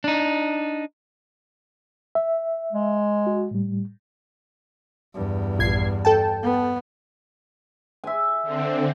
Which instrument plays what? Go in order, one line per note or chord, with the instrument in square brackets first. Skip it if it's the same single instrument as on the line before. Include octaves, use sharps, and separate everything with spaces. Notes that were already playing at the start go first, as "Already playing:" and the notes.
[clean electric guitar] D4 D#4
[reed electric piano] E5
[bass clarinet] G#3
[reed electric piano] F#4
A2 G3
[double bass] E2 G2
[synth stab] A#1 G#6 C7
A4 G5 A5
[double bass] B3
[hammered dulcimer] E5 G#5
[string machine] D3 C4